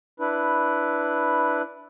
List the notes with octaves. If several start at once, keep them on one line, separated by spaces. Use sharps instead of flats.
D4 E4 B4